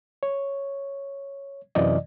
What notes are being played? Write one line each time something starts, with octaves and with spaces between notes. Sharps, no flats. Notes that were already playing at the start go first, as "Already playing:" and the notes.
C#5
F#2 C3 E3 D5 D#5